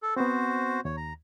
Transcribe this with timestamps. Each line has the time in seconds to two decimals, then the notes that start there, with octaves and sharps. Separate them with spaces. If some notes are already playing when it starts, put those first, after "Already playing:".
0.03 A4
0.17 B3 C4 F#4 C5
0.85 D#2 C#5
0.97 A#5